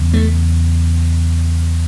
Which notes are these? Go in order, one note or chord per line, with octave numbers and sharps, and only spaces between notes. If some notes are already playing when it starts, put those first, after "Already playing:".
Already playing: E2 C#3
A3